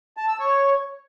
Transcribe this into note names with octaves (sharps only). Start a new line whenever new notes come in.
A5
E6
C#5